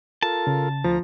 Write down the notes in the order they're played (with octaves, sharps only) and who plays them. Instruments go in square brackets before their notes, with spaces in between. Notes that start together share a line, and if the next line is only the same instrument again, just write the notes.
[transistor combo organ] F4 A4 A#4 [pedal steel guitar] A5
[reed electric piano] C#3
[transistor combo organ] D2 A#5 [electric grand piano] F3